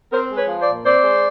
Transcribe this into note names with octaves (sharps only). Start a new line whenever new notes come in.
C4 A#4 C5
G#3
B4 C#5
F3
C5 D5
A#2
C4 C5 D5
G#3